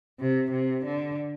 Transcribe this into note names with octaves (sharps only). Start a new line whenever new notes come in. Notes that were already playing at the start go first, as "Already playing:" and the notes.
C3
C3
D3